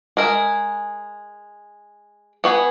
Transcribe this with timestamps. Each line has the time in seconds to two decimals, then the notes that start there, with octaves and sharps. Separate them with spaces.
0.17 G#3 A#4 E5
2.44 B3 F#4 G#4 B4